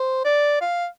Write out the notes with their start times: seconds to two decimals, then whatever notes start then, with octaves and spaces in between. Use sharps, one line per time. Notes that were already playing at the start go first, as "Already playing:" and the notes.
Already playing: C5
0.25 D5
0.61 F5